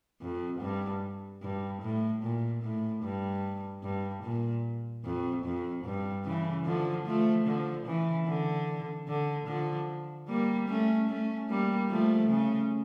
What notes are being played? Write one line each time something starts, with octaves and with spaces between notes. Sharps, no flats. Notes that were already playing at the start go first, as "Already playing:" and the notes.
F2
G2
G2
A2
A#2
A2
G2
G2
A#2
F2
F2
G2
C#3 E3
D3 F3
F3 A3
D3 F3
C#3 E3
D3
D3
D3 F3
G3 A#3
A3 C#4
A3 C#4
G3 A#3
F3 A3
C#3